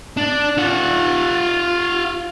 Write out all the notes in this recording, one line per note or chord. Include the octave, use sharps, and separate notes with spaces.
D4
F4 F#5